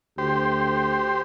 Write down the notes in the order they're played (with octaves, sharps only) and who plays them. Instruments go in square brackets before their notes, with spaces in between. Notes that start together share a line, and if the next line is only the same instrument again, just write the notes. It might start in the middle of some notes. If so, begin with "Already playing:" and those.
[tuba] D2 [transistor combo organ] G4 C5